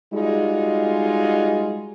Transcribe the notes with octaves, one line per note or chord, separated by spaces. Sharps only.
G3 G#3 D#4 F4 F#4 G#4